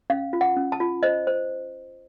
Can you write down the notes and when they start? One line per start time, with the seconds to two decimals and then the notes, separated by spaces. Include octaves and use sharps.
0.10 C#4 F5
0.33 F4
0.41 F#5
0.57 C#4
0.72 A5
0.80 F4
1.03 C5 D#5
1.27 C5